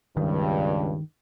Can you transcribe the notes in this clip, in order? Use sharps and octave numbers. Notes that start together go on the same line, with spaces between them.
C#2 G2 D#3